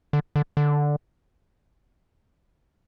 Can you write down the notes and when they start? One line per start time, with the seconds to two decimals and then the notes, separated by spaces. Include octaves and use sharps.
0.13 D3
0.36 D3
0.57 D3